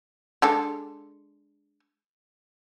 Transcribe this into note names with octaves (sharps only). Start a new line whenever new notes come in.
G#3 D4 A4